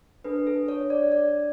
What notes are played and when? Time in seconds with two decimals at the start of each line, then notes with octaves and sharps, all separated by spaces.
0.25 D4 A4 B4
0.47 A4
0.68 C#5
0.90 D5
1.12 D5